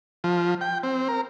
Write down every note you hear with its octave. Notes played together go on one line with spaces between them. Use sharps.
F3
G5
C4
A#4